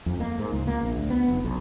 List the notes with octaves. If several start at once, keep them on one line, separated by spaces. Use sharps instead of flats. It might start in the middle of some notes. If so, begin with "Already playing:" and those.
F2
A#3
G#2
C#2
A#3
A#1
D2
B3
F1
B1